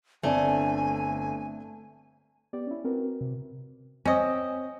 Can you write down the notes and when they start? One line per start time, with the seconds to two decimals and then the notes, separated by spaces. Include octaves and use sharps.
0.23 G1 D3 A3 C4 D5 G#5
2.53 B3 G4 D5
2.67 C#4 E4
2.84 C4 F#4 A#4 B4
3.21 C3
4.05 C4 C#4 D#5